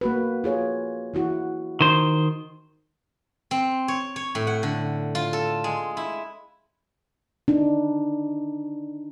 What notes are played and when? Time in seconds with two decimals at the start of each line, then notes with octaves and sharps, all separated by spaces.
0.01 A#3 F#4 B4
0.44 F4 G#4 C#5
1.14 E3 E4 F#4
1.81 D#3 C5
3.51 C4
3.88 C#5
4.16 C#5
4.35 A2
4.47 F#5
4.63 D3
5.15 F4
5.33 A4
5.64 G#3
5.97 E4
7.48 D4 D#4